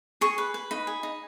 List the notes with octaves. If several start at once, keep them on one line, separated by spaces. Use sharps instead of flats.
G#4 C#6
B4
B4
D#4 B5
G#4
D#4